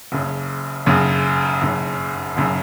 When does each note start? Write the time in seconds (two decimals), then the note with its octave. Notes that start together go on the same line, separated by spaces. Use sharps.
0.12 F#1 F#2 C#3
0.86 F#1 F#2 C#3
1.62 F#1 F#2 C#3
2.37 F#1 F#2 C#3